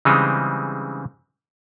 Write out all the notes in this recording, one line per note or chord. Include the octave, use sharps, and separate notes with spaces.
C#3 E3 G3 G#3 C4 D#4